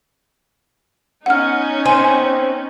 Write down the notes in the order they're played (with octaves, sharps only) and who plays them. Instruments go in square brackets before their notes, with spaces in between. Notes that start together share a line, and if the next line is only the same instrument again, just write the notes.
[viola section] B3 C#4 D#4 [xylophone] F#5 F6
[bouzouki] C4 [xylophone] G#5